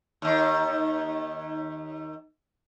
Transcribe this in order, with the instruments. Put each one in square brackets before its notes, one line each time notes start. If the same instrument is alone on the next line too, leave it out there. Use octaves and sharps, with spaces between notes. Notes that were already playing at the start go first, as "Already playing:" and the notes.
[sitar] D#2 D#3